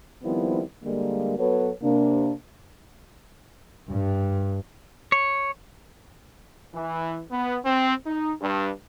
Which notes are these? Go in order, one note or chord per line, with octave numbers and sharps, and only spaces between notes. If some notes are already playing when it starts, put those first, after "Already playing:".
D#3 F3 G3 B3 C4 E4
D3 G3 G#3 A#3
F#3 B3 F#4 A4 B4 C#5
C3 A#3 D4
G2
C#5
E3
B3
C4
D#4
G2